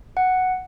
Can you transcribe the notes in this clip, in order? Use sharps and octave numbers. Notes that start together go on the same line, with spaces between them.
F#5